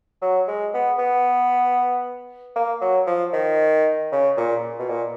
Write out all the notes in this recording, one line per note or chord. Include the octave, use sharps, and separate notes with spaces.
F#3
G#3
B3
B3
A#3
F#3
F3
D#3
C#3
A#2
B2
A#2